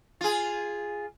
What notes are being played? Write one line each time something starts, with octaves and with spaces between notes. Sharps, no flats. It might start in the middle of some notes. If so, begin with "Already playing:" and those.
F4 G#4